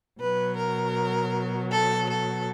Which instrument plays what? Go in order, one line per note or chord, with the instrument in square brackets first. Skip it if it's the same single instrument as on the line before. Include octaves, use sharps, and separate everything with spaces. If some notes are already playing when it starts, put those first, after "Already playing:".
[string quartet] B2 F#3 B4
A#4
A4
A4